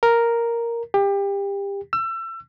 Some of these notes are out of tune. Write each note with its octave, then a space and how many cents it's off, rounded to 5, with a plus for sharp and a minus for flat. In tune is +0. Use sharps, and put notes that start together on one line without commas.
A#4 +0
G4 +25
E6 +30